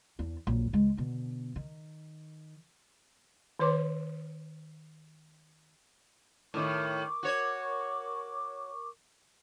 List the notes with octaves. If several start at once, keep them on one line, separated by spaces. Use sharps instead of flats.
E2 D4
A#1 F#3
C#2 G#3
B2 D3
D#3
D#3 B4 C#5 C6 D6
A2 D#3 A#4 C#6 D6
F#4 C#5